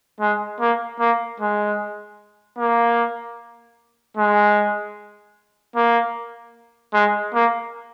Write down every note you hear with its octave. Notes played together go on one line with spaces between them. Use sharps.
G#3
A#3
A#3
G#3
A#3
G#3
A#3
G#3
A#3